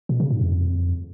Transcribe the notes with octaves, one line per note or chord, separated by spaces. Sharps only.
B2
C#3
G#2
F2